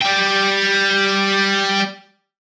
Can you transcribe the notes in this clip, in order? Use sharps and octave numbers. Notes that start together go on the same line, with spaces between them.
G3 G5